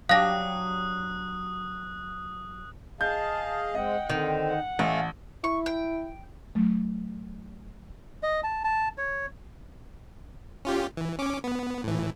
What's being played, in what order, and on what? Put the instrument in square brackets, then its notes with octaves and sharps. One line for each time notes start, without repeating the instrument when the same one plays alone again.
[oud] F#3 D4 G4 [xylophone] F5 A#6 [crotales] D#6 F#6
[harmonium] G#4 D#5 F5 [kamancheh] A5 [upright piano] G6
[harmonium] G#3 C4 [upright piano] D#5 [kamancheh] F#5 G5
[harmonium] D3 C4 [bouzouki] D#3
[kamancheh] F#5
[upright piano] A1 [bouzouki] A3 [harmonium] F5 G#5
[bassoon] E4 [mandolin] C#6
[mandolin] G5
[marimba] F#3 A3
[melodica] D#5
A5
A5
C#5
[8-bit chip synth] C#4 F4 G4
E3
C#4 D6
B3
A2 E3